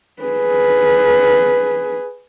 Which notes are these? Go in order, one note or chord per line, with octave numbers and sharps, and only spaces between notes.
G#4 B4